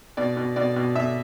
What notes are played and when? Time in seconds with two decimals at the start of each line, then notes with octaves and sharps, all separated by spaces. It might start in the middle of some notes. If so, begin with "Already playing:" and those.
0.17 B2 D5
0.37 B2
0.56 B2 D5
0.76 B2
0.95 B2 E5